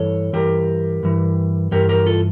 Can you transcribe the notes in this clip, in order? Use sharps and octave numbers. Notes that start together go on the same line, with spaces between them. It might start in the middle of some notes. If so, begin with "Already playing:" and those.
Already playing: G2 E3 A4 C#5
G2 E3 G4 A#4
G2 E3
G2 E3 G4 A#4
G4 A#4
F4 A4